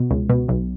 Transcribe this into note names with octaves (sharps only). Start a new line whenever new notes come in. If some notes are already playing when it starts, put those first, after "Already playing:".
Already playing: B2
C#2
B2
B1